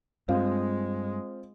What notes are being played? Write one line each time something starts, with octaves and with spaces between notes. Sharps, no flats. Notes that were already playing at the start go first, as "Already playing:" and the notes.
G2 G#3 C4 F4 F5